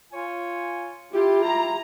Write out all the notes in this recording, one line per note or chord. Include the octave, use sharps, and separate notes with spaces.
F4 C#5 G#5
E4 F4 G4
A#5